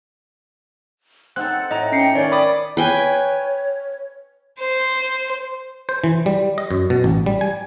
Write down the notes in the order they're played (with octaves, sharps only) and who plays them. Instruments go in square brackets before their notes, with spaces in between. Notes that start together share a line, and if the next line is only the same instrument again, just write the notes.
[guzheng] C4 D#4 A4 [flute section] F#5 [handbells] F#6
[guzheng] A2 [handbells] D#5 A#5
[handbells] C#4 C7 C#7 [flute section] G5
[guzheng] D#3 C#4 [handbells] C#5 [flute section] D5
[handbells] B5 D6 D#6
[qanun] B4 G5 G#5 [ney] C#5
[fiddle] C5
[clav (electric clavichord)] C5
E3
G3
D#5
F#2
B2
A1
G3
G#5